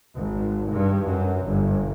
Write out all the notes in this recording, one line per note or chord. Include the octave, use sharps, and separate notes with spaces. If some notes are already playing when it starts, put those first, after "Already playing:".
G#1
G2
F#2
G1